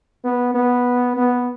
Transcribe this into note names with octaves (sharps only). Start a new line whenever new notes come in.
B3
B3
B3